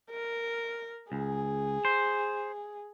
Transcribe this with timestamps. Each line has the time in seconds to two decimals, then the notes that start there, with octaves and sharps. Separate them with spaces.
0.11 A#4
1.12 C#2 G#4
1.85 C5